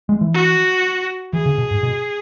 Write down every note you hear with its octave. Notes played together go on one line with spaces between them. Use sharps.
G#3
E3
F#4
E3 G#4
C#3
B2
G#2
B2